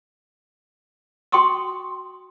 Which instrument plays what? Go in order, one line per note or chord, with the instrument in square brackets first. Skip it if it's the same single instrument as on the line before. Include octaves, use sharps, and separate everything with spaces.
[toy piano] F#4 G5 C6 C#6 D#6